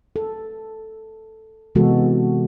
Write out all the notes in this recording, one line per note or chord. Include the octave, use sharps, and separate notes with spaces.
A4
C3 E3 G#3 B3 F#4 A4